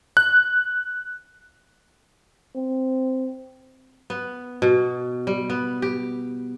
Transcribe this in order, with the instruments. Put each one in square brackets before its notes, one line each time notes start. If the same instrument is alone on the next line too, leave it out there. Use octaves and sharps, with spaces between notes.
[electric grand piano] F#6
[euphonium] C4
[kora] B3
B2
G3
B3
G4